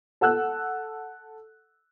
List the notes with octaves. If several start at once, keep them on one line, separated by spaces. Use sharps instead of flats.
A4 F#5 E6 F#6